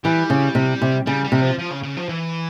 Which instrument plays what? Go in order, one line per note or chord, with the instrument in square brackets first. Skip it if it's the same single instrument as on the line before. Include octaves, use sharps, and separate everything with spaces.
[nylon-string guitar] E3 [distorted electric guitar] G3
[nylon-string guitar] C#3
C3
C3
[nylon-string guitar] C#3 [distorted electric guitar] G3
[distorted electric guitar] G3
[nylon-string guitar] C3
[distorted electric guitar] F3
F3
C#3
C#3
F3
E3